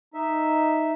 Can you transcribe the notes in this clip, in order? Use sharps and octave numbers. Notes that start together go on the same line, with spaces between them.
D#4 E5